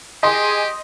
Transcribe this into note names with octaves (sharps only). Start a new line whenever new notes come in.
G4 G#4 D#5 C6